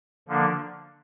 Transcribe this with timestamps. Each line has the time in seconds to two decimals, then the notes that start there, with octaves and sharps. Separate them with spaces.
0.28 D3 F3 A#3 D4